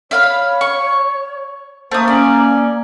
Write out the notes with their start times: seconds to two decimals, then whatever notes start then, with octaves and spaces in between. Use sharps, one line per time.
0.11 C#5 E5 F5 B5
0.61 C#6
1.91 A3 A#3 C5 D#6
2.08 C#4 D5